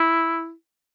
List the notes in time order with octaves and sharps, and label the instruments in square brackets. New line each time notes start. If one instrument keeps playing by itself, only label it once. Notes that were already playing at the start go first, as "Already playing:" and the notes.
Already playing: [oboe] E4